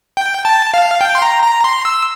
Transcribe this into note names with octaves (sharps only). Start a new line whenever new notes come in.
G5
A5
F5
G5
C6
A#5
A#5
C6
E6